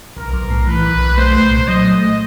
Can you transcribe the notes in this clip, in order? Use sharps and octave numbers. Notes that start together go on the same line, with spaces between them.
B1 A#4
B1
A2
E3 B4
B1
B1
A3 C5
C2
A#2
F#3 D#5
A3